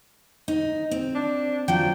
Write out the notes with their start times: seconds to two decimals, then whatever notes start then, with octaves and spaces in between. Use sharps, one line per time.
0.48 D#4
0.91 C4
1.15 D4
1.68 F3 F#3 G5